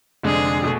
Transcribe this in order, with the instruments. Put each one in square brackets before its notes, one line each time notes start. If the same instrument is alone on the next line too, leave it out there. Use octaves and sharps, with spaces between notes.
[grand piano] F1 F2 D3 G#3 D4 [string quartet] G#4
[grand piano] B2 A3